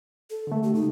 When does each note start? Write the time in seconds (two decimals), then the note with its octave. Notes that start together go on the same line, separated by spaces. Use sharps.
0.30 A4
0.47 D3 A3
0.63 G4
0.75 C#3 G#3 D#4